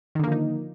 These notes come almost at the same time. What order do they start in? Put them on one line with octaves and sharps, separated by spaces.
D#3 D3 A#3 F3 D#4